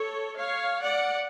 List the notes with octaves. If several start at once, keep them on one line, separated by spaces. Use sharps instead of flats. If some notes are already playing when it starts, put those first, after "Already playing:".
Already playing: A4 C#5
C#5 F5
D5 F#5